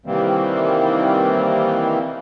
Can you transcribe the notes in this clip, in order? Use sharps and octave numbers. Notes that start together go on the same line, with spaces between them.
C3 D#3 E3 G3 A#3 C4